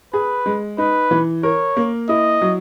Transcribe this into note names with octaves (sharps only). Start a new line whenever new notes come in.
G#4 B4
G#3
D#4 B4
E3
A#4 C#5
A#3
E4 D#5
F#3